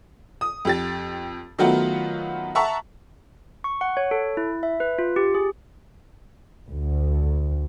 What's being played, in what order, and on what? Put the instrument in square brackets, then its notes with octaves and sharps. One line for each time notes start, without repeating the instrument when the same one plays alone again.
[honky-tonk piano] D#6
F2 G4 A6
D#3 F#3 A3 B3 F4 F#4
E5 F#5 A5 A#5 C#6
[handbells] C#6
F#5
C#5
A4
E4
E5
B4
F4
G4
G#4
[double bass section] D2